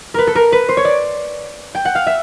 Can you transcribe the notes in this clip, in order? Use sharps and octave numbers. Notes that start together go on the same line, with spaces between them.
A#4 B4
A4
A#4
B4
C5
C#5
D5
G5
F#5
F5
E5